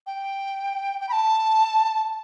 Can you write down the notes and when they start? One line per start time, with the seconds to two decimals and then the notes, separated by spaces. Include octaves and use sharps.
0.06 G5
1.00 G5
1.09 B5
1.12 A5